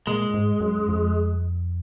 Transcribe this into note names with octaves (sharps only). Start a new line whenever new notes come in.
A#2 G#3
G#2
F#2
F2